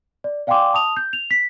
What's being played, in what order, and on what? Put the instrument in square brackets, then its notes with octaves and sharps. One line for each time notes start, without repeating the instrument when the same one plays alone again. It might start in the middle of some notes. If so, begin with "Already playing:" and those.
[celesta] D5
D5 F5 G5 G#5 C6 D6
A5 D#6 F7
G6
F7
B6